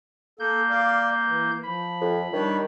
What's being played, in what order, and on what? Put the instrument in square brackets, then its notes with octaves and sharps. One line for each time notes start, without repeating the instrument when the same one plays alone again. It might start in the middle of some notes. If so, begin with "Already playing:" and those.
[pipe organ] A#3 G6 [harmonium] A4
[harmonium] D5 F5
E3
[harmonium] F3 [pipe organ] B5
[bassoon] F2
[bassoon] D#3 [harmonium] G3 D4 C#5